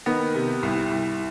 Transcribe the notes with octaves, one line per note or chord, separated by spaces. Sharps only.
D#3 B3
C3
C2
C2